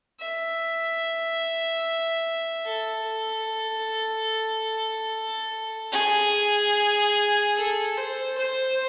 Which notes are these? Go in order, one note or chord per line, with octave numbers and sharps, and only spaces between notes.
E5
A4
G#4
A4
C5
C5